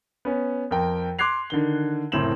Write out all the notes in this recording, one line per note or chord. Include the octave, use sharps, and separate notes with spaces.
B3 C#4
F2 A#4 G5
C6 D6 F#6 G#6 C7 F7
D3 D#3 G7
F#1 A2 C4 E7 F#7